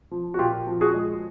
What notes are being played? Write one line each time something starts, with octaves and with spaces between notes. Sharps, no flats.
F3
F#4
A#2 F4 G4
F3
F#4 G#4
G#3